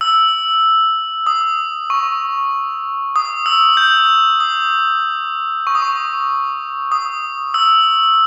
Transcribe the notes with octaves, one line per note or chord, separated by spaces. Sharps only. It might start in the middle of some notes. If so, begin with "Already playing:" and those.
E6
D#6
C#6
D#6
E6
G6
D#6
C#6
D#6
C#6
D#6
E6